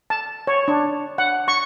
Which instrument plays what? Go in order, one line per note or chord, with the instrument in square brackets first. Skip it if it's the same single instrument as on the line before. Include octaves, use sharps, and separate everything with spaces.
[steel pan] A5
C#5
D4
F#5
C#6